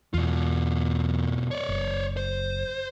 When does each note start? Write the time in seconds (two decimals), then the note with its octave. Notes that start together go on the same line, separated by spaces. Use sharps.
0.14 E2 B2 F4
1.51 C#5 D5
1.68 F#1
2.17 C5